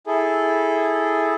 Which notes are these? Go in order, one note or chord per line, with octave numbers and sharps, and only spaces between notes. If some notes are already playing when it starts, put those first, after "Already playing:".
E4 G#4 A4